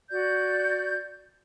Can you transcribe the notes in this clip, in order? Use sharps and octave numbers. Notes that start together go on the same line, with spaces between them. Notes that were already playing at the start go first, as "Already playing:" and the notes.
F#4 D5 G6